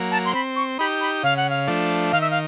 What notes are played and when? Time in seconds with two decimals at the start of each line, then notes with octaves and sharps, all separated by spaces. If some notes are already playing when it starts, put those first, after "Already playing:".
Already playing: F#3 A#3
0.11 A5
0.25 C6
0.33 C4 B5
0.56 C#6
0.78 D#4 G4 B5
1.01 B5
1.23 C#3 F5
1.37 F#5
1.50 F5
1.68 F3 A3 D4
2.12 D#3 F5
2.21 E5
2.30 F5